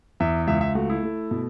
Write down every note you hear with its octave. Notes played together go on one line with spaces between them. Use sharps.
E2 E5
C#2 E5
E5
A3 F#4
E4
A3
B2